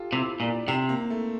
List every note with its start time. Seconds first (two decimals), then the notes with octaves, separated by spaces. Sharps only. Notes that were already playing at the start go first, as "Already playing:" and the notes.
Already playing: F4 G4 A4
0.12 C3 E4
0.40 A#2 D4
0.68 C3 C4
0.89 A#3
1.10 A3